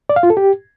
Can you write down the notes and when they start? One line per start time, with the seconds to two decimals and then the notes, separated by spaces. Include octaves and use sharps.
0.09 D5
0.16 F5
0.23 F4
0.30 A4
0.37 G4